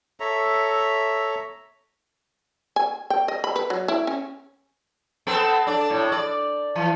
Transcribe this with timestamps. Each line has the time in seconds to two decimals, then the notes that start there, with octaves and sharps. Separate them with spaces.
0.20 A4 C#5 E5 A#5
2.76 G#5
3.10 G5
3.28 D#5
3.44 B5
3.56 B4
3.70 F#3
3.88 E4
4.07 C#4
5.27 B3 C4 A4
5.67 D4 D5
5.90 A2
6.12 D5
6.76 E3